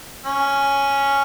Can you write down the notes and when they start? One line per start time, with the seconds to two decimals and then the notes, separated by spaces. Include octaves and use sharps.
0.25 C#4